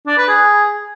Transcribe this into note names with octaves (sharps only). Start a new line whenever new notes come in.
D4
B4
G#4